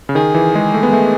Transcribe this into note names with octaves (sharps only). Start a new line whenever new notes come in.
C#3
D#3 G#4
E3
G#3
A3
B3
A3